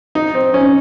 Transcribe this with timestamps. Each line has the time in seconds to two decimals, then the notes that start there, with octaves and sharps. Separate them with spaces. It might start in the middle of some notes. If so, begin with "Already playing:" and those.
0.15 D#4
0.35 C4
0.54 C#4